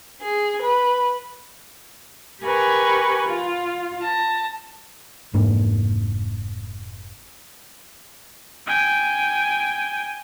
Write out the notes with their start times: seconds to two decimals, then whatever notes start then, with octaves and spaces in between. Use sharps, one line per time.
0.23 G#4
0.63 B4
2.41 G4 A#4 B4 G#5 C#6
3.26 F4
4.01 A5 A#6
5.34 F1 G#2 A#3 D4
8.67 G5 G#5